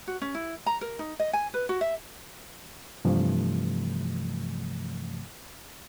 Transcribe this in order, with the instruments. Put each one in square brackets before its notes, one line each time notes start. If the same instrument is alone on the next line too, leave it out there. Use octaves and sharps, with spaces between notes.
[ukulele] F#4
C#4
E4
A#5
A#4
D#4
D#5
G#5
B4
F#4
E5
[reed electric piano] G2 C3 E3 F3 A3